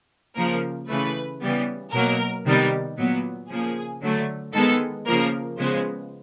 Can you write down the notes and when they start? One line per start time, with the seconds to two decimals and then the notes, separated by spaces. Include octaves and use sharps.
0.36 C#3 F3 A#3 A#4
0.88 C#3 E3 A3 B4
1.41 C#3 E3 G3 B3
1.93 B2 F#3 A#3 A#4
2.46 C3 D#3 G3 B3
2.97 A#2 F#3 B3
3.50 C#3 F3 A#3 G#4
4.02 D3 F#3 A3
4.54 D#3 G#3 B3 A4
5.07 C#3 F3 A#3 A#4
5.58 C#3 F3 G#3 B3 C5